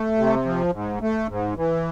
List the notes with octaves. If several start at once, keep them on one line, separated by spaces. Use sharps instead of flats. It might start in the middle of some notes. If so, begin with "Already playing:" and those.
Already playing: A3
C3
F3
G#2
A3
G#2
E3